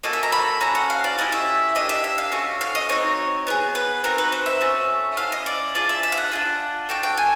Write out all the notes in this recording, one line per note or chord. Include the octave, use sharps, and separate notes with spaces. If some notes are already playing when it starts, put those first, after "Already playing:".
A#3 C#4 F#4 A4 D#5
E5
A#5
B5
C#4 F#4 A4 A#5
F#5
F5
D5
A3 C#4 E4 G4 D#5
E5
A#3 D4 G4 D#5
E5
E5
F5
A3 C#4 F#4
F5
D#5
C4 D#4 F#4 C#5
B3 E4 G#4
B4
C4 D#4 F#4 A#4
B4
C5
E5
A3 C#4 F#4
C#4 E4 A4 F5
D#5
D5
D4 F4 G#4 D5
E5
E5
F5
F#5
D4 F4 G#4
D4 F#4 A4 G5
G5
G#5